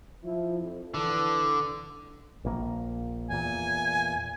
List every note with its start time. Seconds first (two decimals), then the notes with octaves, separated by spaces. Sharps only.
0.24 F3 E4
0.59 F2
0.94 D3 E3 A4
2.45 A#1 A#3
3.30 E2 A#2 G#5